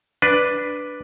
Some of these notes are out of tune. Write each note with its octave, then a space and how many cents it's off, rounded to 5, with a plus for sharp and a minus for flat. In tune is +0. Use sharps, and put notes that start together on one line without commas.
D4 +0 B4 +0